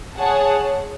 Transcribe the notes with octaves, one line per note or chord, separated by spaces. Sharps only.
G#4 C#5 F#5 A5